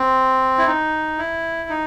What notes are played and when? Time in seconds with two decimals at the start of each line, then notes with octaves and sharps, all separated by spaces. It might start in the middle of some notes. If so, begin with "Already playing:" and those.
Already playing: C4
0.58 E4
0.67 D#4
1.18 E4
1.69 D#4